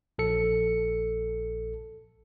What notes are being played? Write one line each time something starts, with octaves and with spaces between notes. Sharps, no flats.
A#1 A4 C#7